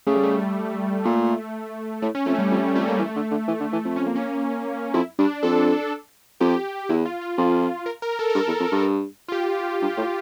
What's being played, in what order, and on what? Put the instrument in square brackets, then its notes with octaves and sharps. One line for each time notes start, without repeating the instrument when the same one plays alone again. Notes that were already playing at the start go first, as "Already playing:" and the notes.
[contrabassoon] C#3 [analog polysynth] A3
[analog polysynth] G3
A3
[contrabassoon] A#2 [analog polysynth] A3
[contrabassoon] A2 [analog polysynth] A3
[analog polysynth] C#4
[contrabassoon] F2 [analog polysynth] A3
[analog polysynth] G3
[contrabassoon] F2 [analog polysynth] G3
[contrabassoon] F2 [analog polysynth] A3
[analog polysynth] A#3
[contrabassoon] E3 [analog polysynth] A3
[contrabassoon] D3
D3
E3
D3
E3
F2
[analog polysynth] C#4
A#3
C#4
[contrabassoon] F2 [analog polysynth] E4
[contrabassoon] G2 [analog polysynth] D4
[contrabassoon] F2 [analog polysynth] A4
[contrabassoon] F2 [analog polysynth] G4
[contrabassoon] E2 [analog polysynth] E4
[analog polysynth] F4
F4
[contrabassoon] F2
[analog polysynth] A#4
A#4
A4
A#4
[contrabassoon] G2 [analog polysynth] A4
[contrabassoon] E2
F2
G2
[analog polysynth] F4
G4
[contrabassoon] G2
A2